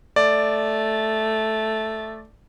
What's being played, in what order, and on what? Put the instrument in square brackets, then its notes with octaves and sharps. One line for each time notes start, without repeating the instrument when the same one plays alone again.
[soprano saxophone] A3 [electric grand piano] D5